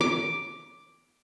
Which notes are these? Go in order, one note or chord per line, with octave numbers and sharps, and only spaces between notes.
D6